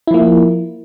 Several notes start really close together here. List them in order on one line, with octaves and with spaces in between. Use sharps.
E4 F3 A#3